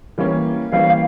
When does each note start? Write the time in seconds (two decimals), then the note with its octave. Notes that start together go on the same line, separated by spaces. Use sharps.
0.18 E3 G3 A#3 C#4
0.72 E3 G3 A#3 C#4 F5